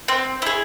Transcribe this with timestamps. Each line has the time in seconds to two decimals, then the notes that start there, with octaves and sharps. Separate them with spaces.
0.08 C4
0.42 E4 G#4